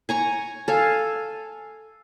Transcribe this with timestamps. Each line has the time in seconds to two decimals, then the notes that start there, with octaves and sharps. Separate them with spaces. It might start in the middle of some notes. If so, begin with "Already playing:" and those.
0.09 G#5 A#5 C#6
0.68 A4 F5 G#5